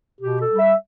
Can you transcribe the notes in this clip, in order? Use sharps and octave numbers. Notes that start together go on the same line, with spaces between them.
B2 G4
A4
G3
E5